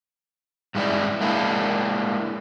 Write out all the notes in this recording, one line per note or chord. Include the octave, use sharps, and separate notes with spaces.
G2 G#3 E4 D5
G#3 A#3 D4 E4